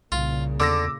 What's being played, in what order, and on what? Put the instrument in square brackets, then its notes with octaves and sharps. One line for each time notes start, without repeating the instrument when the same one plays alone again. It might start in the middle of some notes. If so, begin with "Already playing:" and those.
[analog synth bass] C2 [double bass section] A#2 C#3 [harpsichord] F4
[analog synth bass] E2 [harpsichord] D3 [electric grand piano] D6 E6 A#6